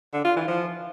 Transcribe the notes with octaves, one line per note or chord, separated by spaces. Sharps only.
D3
F4
E3
F3